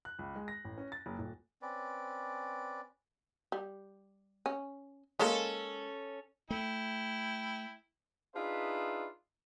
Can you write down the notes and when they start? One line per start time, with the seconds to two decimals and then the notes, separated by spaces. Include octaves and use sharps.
0.05 F#6
0.19 C#2
0.36 G#3
0.48 A#6
0.65 A1
0.78 C#4
0.92 A6
1.06 F#1
1.19 D#1
1.62 C4 C#4 B4 D5
3.52 G3
4.46 C#4
5.19 G#3 A#3 C#4 A4
6.50 A3 E4 G5
8.35 D4 D#4 F4 G#4 B4 E5